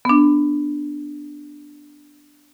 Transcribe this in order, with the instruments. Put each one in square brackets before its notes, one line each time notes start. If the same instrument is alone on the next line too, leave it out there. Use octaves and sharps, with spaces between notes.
[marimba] B3 D4